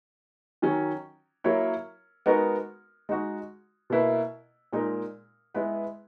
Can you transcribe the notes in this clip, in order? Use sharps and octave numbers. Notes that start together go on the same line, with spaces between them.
D#3 F#3 C#4
F#3 A#3 E4 A#4 C#5
G#3 B3 D#4 F#4 A#4
G#3 D#4 F#4
B2 A#3 E4 B4
A#2 G#3 D#4 A#4
G#3 B3 E4 B4